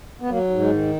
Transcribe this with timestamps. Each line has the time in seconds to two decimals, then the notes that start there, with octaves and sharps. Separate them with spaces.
0.21 B3
0.29 F#3 A#3
0.50 G#2
0.61 G#3
0.72 D#3